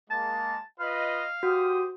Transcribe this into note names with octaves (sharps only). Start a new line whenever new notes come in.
G#3 A#3 A5
F4 B4 D#5 F5
F#4 G4 C5 D#6